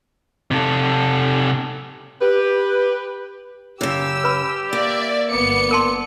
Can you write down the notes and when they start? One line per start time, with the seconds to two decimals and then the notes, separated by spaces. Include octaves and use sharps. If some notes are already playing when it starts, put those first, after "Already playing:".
0.51 C3 A4
2.21 G4 B4
3.81 F#2 C#3 G4 E6
4.24 B4 B5
4.73 A#3 D5 E5
5.31 G1 B3 D5 C#7
5.71 A#4 A5 C6